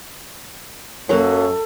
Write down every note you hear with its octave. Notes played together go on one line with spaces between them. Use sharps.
F#2 F#3 A#3 A4